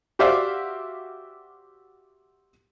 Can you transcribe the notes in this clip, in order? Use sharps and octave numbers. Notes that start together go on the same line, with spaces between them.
F#4 G4 C5 D5 E5 F5